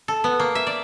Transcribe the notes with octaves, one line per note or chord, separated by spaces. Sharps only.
A4
B3
A#3
E5
D5